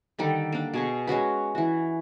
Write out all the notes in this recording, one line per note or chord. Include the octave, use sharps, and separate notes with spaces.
D3 D#3 G3 A4
A#3 D4
B2 G#4 C#6
G#3 C#4 F#4 B4
E3 F#4